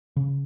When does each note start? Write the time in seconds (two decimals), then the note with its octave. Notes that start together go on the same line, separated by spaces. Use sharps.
0.17 C#3